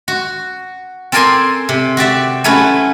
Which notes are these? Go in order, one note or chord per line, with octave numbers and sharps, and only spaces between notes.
F#4
C4 A4 A#4 D5 G#5 C6
C3
F#4 G4 D5 E5
F#3 A3 C#4 E4 B4